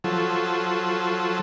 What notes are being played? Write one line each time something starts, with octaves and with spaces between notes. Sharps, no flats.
F3 F#3 A4